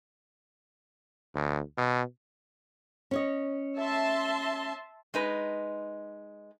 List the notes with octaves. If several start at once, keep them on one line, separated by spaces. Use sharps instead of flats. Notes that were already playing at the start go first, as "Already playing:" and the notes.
D2
B2
C#4 C#5 D#5
E5 A5 C6
G#3 D#4 B4